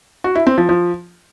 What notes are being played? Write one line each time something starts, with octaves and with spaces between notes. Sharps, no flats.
F#4
E4
C4
F3
F3